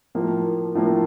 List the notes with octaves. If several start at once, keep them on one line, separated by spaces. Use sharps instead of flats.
A2 F3 A#3
A2 F3 A#3